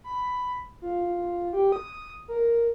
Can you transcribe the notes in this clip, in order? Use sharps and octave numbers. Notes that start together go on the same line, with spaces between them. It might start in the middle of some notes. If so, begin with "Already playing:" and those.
B5
F4
G4
D#6
A#4